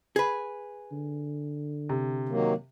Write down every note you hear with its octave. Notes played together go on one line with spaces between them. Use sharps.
G#4 B4
D3
C3
D#3 F#3 A#3